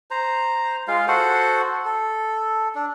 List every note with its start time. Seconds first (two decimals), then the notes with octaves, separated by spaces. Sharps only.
0.11 C5 A#5
0.88 G#3 F4 F5
1.08 F#4 A4 C5 F#5
1.85 A4
2.75 D4